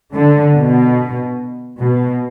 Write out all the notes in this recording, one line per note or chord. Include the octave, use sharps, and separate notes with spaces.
D3
B2
B2